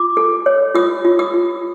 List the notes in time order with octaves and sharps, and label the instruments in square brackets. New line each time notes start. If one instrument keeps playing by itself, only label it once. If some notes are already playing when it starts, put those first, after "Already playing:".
Already playing: [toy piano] F4 D6
A4
C#5
F4 D#6
F4
D#6
F4